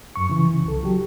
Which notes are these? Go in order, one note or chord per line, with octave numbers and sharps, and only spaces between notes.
F#2 C#6
C#3 E3
C2 A4
F#3 G4